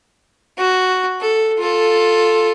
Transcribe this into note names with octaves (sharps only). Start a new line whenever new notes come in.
F#4
A4
F4 A4